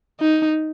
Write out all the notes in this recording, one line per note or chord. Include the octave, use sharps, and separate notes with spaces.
D#4